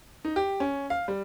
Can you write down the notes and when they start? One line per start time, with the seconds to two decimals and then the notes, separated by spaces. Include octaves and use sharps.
0.25 D#4
0.36 G4
0.60 C#4
0.90 F5
1.08 G3